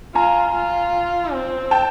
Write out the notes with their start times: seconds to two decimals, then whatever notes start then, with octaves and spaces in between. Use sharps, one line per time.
0.15 F4 G#5 A#5
0.54 F4
1.33 C4
1.71 G5 A5